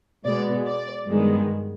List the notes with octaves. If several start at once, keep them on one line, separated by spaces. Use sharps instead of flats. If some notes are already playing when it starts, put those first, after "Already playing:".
B2 G#3 B3 D5
D5
G2 D#3 G#3 B3